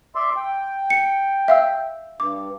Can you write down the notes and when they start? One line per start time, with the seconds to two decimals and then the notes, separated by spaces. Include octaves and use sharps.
0.15 D5 E5 C6
0.36 G5
0.90 C#7
1.48 E5 F5 E6
2.20 G2 D6